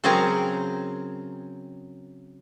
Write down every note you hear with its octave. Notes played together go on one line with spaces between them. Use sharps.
C#3 F#3 C4 G#4 A#4 A#5